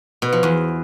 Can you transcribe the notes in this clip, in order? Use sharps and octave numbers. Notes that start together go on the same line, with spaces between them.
B2
F3
E2